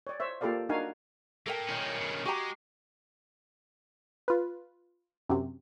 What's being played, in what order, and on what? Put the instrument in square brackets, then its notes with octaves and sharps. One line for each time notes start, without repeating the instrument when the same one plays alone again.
[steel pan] C#5 D5
C5 C#5 E5
A#3 F4 G4 A4 D5 F5
D4 D#4 F#4 A#4 F5 G#5
[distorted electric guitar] A#2 A#3 [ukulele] A4 A#4 G5
[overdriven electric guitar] D#3 C#4
[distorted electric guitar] G2 B2
[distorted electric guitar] G#3 [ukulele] F#4 G4 A#5
[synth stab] F4 B4
F#2 C3